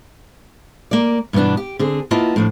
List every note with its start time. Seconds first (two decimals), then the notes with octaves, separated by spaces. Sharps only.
0.91 A#3 D5
1.33 G2 B2 E3 B3 D4
1.57 G4
1.79 D3 C4 G#4
2.11 A#3 B3 E4 F4 D#5 A5
2.36 A2 F3 D4